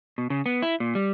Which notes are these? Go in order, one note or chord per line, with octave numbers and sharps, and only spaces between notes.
B2
C#3
B3
E4
A#2
G3